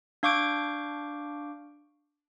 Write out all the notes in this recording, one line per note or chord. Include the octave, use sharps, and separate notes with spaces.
D4 F5 C#6 D6 G6 D7